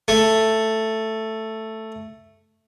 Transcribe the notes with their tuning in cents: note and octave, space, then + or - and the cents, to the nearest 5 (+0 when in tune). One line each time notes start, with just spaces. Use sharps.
A3 +5